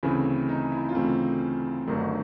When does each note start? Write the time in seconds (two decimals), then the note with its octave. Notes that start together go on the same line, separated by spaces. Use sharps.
0.03 D2 C#3 E3 A3 C4 E4
0.49 D#4
0.72 E4
0.89 F4
0.95 D2 C#3 E3 A3 C4 E4
1.87 G1 G2 D#3 F#3 A3